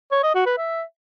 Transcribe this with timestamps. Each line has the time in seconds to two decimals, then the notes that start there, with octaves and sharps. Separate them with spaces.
0.12 C#5
0.23 D#5
0.35 F#4
0.46 B4
0.58 E5